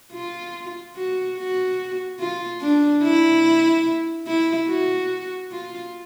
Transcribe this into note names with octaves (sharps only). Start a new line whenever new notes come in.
F4
F#4
F#4
F4
D4
E4
E4
F#4
F4